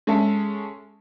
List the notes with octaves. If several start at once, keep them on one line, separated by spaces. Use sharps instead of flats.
G#3 C#4 A4 E5